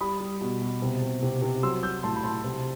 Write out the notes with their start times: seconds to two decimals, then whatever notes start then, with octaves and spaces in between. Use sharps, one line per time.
0.01 G3 B5 D#6
0.20 G3
0.41 B2
0.62 B2
0.82 C3
1.02 C3
1.22 C3
1.42 C3
1.63 F#3 C6 E6
1.83 F#3 E6 G6
2.03 A2 A5 C6
2.16 B5
2.23 A2 A5 C6
2.44 C3